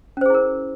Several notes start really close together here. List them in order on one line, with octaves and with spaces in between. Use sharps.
C#4 C5 G#4 E4 A#4